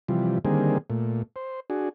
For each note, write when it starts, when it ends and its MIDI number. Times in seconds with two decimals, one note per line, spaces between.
0.08 0.38 48
0.08 0.38 52
0.08 0.38 53
0.08 0.38 55
0.45 0.78 50
0.45 0.78 51
0.45 0.78 55
0.45 0.78 58
0.45 0.78 60
0.45 0.78 68
0.90 1.22 46
0.90 1.22 57
1.36 1.60 72
1.70 1.89 62
1.70 1.89 66
1.70 1.89 68